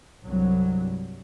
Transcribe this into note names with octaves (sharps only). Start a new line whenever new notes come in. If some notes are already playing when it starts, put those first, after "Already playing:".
C2 G2 F#3